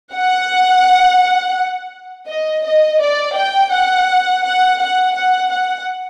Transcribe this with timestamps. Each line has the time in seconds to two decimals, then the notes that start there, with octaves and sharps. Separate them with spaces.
0.13 F#5
2.27 D#5
2.64 D#5
3.00 D5
3.36 G5
3.72 F#5
4.43 F#5
4.79 F#5
5.15 F#5
5.51 F#5